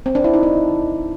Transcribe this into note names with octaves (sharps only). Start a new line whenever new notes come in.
C4
D4
E4
D#4
D4